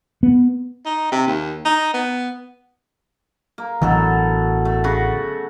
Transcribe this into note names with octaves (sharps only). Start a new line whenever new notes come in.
B3
D#4
C3
D#2
D#4
B3
A#3
A1 B2 D3 E3 F#3 A4
A3
C#3 F#4